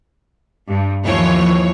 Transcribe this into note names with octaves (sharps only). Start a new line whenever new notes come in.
G2
D#2 E3 F3 C#5